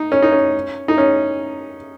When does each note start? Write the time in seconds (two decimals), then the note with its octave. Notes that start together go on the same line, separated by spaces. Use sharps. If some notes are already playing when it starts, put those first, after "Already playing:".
Already playing: D#4
0.12 C#4
0.22 D#4
0.32 C#4
0.88 D#4
0.98 C#4